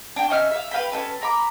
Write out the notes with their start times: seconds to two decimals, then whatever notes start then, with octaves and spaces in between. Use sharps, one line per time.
0.16 D4 G5
0.30 C#4 D#4 E5 F6
0.51 E5 F5
0.71 B4 F5 G5 B5
0.92 C#4 D#4 A4 B4
1.21 A#5 B5 D6